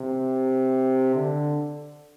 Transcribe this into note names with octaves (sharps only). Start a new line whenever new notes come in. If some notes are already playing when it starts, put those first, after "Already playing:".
Already playing: C3
D3